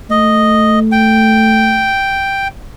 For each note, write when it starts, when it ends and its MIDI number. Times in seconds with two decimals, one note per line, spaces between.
0.10 1.98 57
0.10 0.79 75
0.92 2.48 79